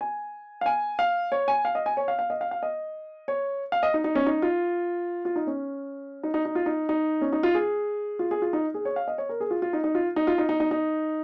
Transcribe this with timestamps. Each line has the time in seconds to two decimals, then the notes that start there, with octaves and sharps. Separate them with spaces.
0.01 G#5
0.61 F5
0.66 G#5
0.99 F5
1.32 C#5
1.48 G#5
1.65 F5
1.75 D#5
1.86 G#5
1.97 C#5
2.08 F5
2.19 F5
2.30 D#5
2.41 F5
2.51 F5
2.63 D#5
3.28 C#5
3.72 F5
3.83 D#5
3.94 D#4
4.04 D#4
4.15 C#4
4.26 D#4
4.42 F4
5.25 F4
5.36 D#4
5.47 C#4
6.23 D#4
6.34 D#4
6.45 D#4
6.55 F4
6.66 D#4
6.89 D#4
7.21 C#4
7.33 D#4
7.43 F4
7.54 G#4
8.19 F4
8.31 G#4
8.42 F4
8.53 D#4
8.74 G#4
8.85 C#5
8.96 F5
9.08 D#5
9.18 C#5
9.29 A#4
9.40 G#4
9.51 F4
9.62 F4
9.73 D#4
9.84 D#4
9.95 F4
10.16 D#4
10.27 F4
10.38 D#4
10.49 D#4
10.60 D#4
10.71 D#4